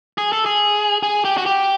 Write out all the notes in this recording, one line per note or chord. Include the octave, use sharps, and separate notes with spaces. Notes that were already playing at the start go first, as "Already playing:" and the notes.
G#4
A4
G#4
G#4
G4
F#4
G4